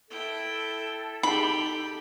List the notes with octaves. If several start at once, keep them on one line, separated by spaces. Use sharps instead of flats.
E4 A4 G5
D#4 G4 G#4 G5 B5